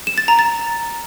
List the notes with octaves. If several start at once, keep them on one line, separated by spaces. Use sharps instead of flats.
E7
A6
A#5
A6